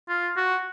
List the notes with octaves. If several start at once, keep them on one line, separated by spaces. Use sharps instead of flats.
F4
F#4